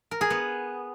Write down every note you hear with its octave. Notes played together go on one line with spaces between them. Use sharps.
A#4
G#4
B3